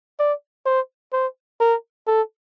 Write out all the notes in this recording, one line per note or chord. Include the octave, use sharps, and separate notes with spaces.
D5
C5
C5
A#4
A4